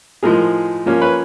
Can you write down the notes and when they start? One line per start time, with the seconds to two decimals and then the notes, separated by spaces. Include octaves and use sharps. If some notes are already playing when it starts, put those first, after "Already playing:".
0.23 A2 F3 G#3 G#4 A#4
0.86 F3 A#3 C#4
1.01 B4 C#5